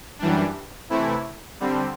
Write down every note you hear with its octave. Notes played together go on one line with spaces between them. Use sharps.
F#2 E3 G3 D4
C3 E3 A3 E4
D3 G3 C4